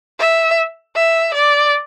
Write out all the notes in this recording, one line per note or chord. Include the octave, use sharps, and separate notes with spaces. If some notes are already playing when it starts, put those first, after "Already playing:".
E5
E5
D5